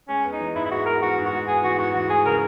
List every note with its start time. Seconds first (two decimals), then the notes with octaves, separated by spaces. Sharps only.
0.09 G#3 C#4
0.25 B3
0.32 D#4
0.41 E3
0.55 G#2 E4
0.66 E4
0.71 G#3 F#4
0.86 B3 A#4
1.02 E3 F#4
1.18 G#2
1.25 F#4
1.32 G#3
1.48 B3 G#4
1.63 E3 F#4
1.79 G#2 F#4
1.94 E3 F#4
2.09 G#3 G#4
2.25 C#3 A#4